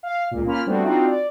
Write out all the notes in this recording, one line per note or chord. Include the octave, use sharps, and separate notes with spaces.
F5
C#2 A#2
A#3 C#4 F4 B5 F6
G3 A3 B3 C4 D4 F#4
C4 D4 D#4 F4 F#4
D5